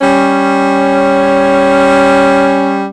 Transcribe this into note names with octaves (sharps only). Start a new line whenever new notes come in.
G3 C#4